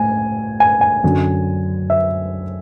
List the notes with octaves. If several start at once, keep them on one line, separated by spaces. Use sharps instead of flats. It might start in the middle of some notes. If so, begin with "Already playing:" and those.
Already playing: A2 G#5
G#5
G#5
F#2 D3 F#3
E5